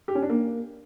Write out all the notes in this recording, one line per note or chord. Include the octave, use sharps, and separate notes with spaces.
G4
C#4
D4
A#3